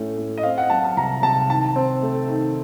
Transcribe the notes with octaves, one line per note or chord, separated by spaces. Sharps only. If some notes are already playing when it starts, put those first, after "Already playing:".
Already playing: A2 A3 C#4
A3
D#5
C4 F5
F#5
F#3 A5
A5
C2 A#5
C3 A5
D#3 A5
C4
A3
D#3